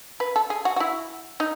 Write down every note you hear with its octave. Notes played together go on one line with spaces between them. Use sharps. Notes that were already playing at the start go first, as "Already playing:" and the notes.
B4
A4
G#4
F#4
F#4
E4
D#4